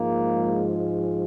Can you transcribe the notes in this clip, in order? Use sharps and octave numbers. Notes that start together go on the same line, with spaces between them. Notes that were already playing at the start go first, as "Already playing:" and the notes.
Already playing: G#2 F3 G#3 A#3